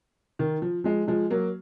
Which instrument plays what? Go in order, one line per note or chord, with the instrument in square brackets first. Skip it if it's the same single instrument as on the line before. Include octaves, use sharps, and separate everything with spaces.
[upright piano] D#3
F3
F3 G#3
F3 G#3
F#3 A#3